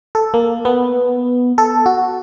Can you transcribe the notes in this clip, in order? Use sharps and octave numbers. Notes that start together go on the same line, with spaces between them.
A4
A#3
B3
A4
F#4